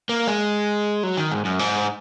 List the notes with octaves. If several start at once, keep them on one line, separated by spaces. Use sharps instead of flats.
A#3
G#3
F#3
D#3
G#2
F#2
G#2